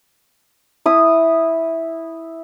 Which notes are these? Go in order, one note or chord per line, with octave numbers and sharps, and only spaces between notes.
E4 D#6